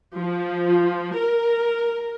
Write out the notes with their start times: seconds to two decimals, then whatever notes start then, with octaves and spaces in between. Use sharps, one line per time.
0.18 F3
1.17 A#4